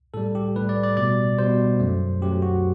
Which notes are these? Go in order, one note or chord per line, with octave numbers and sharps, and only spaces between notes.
A2 G3 A4
G4
A2 G3 B4
D5
D5
B2 G3 D5
B2 G3 C5
F#2 F#3 A3
F#2 F#3 A3 G4
F#4